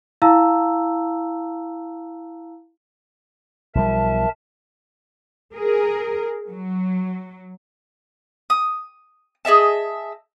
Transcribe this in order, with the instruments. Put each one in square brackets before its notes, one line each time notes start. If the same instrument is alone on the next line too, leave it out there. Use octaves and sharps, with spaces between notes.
[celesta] E4 F5 A5 A#5 E6
[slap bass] B1 F3 G3 [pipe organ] A#4 E5 A5
[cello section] G#4 A#4
F#3
[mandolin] D#6
G#4 D#5 E5 A5